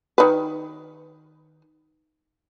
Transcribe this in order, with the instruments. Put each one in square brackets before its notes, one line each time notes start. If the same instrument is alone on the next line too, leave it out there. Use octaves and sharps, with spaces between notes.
[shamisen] D#3 B4